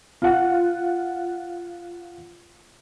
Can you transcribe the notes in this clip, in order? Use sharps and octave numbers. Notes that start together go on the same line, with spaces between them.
F4 F#5